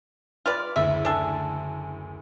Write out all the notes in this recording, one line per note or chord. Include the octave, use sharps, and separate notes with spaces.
F4 B4 D5 F6
F#1 D2 E4 E5
D4 A4 G#5